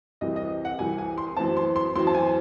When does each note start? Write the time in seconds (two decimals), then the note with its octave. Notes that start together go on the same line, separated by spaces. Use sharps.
0.21 C2 C3 E3 D#5
0.36 D#5
0.65 F#5
0.79 C2 C3 E3 G#5
0.98 G#5
1.18 C6
1.37 F#2 E3 C4 A5
1.57 C6
1.76 C6
1.96 F#2 E3 C4 C6
2.07 A5
2.15 G#5